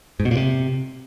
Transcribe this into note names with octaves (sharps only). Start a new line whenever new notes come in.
G#2
B2
A#2
C3